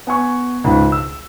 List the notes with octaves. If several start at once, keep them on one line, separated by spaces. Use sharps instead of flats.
B3 G#5 C#6
C#2 G#2
E6